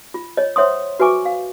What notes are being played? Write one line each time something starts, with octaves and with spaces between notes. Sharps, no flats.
F4
C#5 D#5
C5 C#5 E5 F#5 C6 D#6
F#4 B4 E5 G#5 C#6 D6
F5